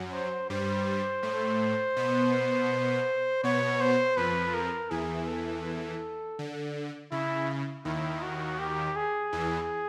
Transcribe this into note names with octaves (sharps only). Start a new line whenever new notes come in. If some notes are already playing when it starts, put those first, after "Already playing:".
Already playing: F#2 F#3
C5
G2 G3 C5
A2 A3
B2 B3
B2 B3 C#5
C5
F2 F3 B4
A#4
E2 E3 G#4
A4
D3
C#3 E4
D#2 D#3 E4
F#4
G4
G#4
E2 E3